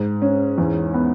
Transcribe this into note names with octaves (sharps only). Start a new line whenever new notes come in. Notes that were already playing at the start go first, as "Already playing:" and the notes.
Already playing: G#2
C#4
E2
B3